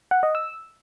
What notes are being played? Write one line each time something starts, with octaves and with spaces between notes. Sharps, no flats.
F#5
D#5
E6